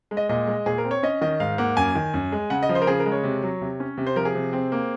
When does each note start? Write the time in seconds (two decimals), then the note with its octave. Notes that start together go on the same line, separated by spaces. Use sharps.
0.11 G#3
0.17 D#5
0.29 A#2 D#5
0.47 G#3
0.66 A#2 G#4
0.78 A#4
0.85 C4
0.91 C#5
1.03 C#4 D#5
1.21 D#3 D#5
1.40 G#2 F5
1.58 A#3 F#5
1.77 F#2 G#5
1.95 D#3
2.14 F#2
2.32 G#3
2.50 C#3 F#5
2.63 D#5
2.69 F3
2.75 C5
2.82 A#4
2.87 C#3 G#4
2.99 A#4
3.06 G#3
3.12 C#5
3.24 C3
3.42 F#3
3.61 C3
3.80 C#4
3.98 C3
4.07 C5
4.16 F3 A#4
4.25 G#4
4.35 C3
4.53 C4
4.72 A#3